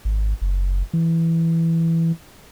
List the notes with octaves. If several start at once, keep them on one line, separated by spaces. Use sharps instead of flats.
G#1
F#1
E3